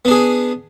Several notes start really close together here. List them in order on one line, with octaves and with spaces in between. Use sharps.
B3 D4 G#4